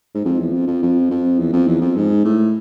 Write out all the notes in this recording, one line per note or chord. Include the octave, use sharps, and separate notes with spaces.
G#2
F2
E2
F2
F2
F2
F2
E2
F2
E2
F2
G#2
A2